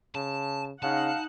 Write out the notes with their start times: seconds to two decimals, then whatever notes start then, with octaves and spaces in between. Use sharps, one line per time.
0.15 C#3 A5
0.83 C#3 D#4 F5 F#5 A5